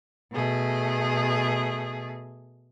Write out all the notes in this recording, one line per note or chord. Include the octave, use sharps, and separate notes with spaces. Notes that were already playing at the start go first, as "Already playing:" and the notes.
B2 A3 G#4